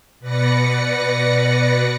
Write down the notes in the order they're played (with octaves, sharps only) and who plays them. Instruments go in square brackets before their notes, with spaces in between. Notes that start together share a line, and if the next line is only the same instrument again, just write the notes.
[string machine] B2 B4 D5 A#6 C#7